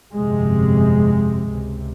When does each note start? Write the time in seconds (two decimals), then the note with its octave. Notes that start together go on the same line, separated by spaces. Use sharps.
0.14 G1 F2 C3 G#3
1.51 C#2 C3